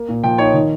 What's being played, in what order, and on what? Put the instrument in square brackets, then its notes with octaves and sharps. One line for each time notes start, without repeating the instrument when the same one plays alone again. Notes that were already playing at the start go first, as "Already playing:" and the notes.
Already playing: [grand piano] A#3
A#2
F3 G5
D#4 C#5
D#3